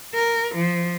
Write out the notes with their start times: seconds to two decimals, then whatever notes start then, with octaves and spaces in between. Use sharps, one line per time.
0.14 A#4
0.55 F3